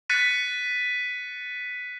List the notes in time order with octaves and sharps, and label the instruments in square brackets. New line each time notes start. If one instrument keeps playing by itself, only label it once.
[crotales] F#6 A6 B6 C#7 D#7